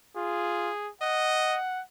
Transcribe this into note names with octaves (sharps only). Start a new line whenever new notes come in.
F4 G#4
D#5 F#5